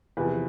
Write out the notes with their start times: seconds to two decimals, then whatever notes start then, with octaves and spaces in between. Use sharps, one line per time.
0.17 E2 C3 F3 B4